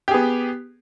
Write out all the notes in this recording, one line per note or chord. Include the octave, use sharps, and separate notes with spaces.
B3 G4 G#4